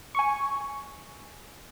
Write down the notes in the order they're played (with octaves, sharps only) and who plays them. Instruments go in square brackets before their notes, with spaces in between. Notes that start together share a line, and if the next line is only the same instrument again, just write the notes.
[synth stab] G#5 C#6